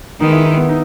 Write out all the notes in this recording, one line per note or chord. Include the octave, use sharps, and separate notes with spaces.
D#3 G#3 B3 D#4
E4
D#4
B3
D#4